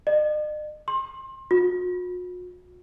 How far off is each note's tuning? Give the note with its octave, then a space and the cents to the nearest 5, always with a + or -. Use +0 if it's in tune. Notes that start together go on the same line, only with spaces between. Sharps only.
D#5 -45
C6 +30
F#4 -45